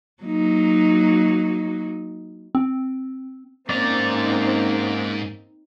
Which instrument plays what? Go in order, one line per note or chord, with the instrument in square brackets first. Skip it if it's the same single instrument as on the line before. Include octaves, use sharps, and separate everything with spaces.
[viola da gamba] F#3 A#3 D#4
[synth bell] C4
[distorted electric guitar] G#2 A#5 [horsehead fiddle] A#3 C#4 [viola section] C4 D#4 [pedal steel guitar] D5